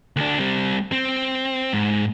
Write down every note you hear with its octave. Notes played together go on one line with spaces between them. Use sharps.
D2 D4
G3 C4
C4
G#2